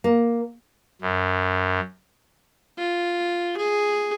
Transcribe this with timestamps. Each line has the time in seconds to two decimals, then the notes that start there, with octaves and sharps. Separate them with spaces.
0.04 A#3
1.02 F#2
2.78 F4
3.57 G#4